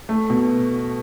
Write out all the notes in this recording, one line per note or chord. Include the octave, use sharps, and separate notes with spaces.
A3
B2